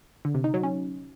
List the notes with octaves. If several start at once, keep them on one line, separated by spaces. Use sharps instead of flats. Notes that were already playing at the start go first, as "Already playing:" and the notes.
D3
C3
D#4
F#3
C#4